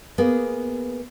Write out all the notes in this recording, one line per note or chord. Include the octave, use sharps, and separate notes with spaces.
A#3 B3 G#4